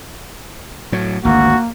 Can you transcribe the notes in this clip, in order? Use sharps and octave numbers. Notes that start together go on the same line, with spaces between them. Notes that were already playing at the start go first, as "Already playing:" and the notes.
A2 F#3
G#1 D2 A#3 F#4